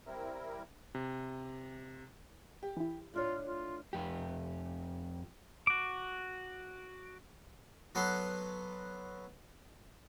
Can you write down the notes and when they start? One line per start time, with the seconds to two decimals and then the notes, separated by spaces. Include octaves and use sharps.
0.06 G3 C4 E4 A#4
0.95 C3
2.63 G4
2.77 E3 E4
3.14 A2 D4 F4 C#5
3.45 F4
3.93 F2 G4
5.67 F#4 D6
7.95 F#3 B3 A4 F#5 C6